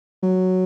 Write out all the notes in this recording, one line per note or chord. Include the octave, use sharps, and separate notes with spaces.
F#3